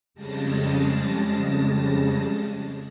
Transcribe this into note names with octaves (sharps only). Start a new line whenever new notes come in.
F2 C#3 G3 G#3 A5 A#6